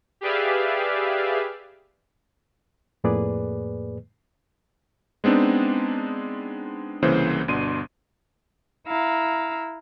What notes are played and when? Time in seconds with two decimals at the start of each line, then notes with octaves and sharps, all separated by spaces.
0.21 G4 G#4 B4 D5 E5 F5
3.04 F2 A2 A#3 G#4 B4 D5
5.24 G#3 B3 C4 D4 D#4
7.02 C2 C#3 E3 A#3 C5
7.48 G1 B2 D4 C6 D#7
8.87 E4 F5 A#5 E6